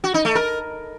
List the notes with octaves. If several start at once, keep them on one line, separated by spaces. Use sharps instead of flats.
F#4
D#4
A3
A#4